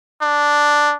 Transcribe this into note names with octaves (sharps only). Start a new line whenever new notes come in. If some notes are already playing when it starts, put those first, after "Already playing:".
D4